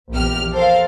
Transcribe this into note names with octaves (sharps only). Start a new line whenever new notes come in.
A#1 E2 G4 F6
A4 A#4 C5 F5